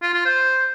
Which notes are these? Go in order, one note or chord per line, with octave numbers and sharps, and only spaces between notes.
F4
F4
C5